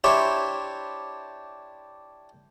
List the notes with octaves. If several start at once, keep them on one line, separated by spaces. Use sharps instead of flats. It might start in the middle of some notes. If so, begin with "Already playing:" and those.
D4 E4 G4 C5 C#5 E5